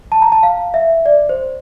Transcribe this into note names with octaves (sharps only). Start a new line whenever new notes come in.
A5
A#5
A5
F5
E5
D5
C5